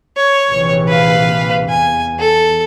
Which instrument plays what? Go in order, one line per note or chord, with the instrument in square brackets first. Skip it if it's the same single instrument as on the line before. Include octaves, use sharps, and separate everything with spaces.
[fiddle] C#5
[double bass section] A#1 C3 E3
[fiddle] B4 F5
[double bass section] E2 [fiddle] G#5
[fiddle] A4